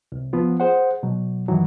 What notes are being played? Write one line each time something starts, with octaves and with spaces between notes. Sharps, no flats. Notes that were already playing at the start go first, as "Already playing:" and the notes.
C2
F3 B3 F4
G#4 C5 F#5
B2 F#3
G2 D#3 E3 F#3